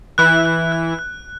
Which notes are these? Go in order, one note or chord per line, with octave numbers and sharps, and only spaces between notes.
E3 E4 F#6
F#6
F#6
F#6